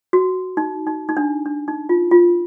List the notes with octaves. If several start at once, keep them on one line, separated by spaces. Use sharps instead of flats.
F#4
D#4
D#4
D#4
D4
D4
D#4
F4
F4